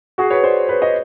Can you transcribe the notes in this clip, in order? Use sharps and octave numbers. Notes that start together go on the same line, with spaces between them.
F#4 G#4
B4 C#5
C5 D5
B4 C#5
C#5 D#5